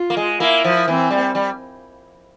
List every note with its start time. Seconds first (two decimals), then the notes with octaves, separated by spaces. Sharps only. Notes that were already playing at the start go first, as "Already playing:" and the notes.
Already playing: F4
0.10 A#3
0.17 G#3
0.40 A#3 E4
0.64 F3
0.88 E3 C4
1.11 G3
1.35 G3